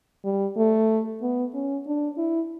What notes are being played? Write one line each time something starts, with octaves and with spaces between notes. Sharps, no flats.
G3
A3
B3
C#4
D4
E4